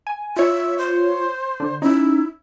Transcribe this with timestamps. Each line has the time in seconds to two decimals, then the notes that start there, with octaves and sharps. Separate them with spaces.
0.07 G#5
0.36 F4 C#5 E5
0.78 C5
1.60 D3
1.82 C#4 D#4 E4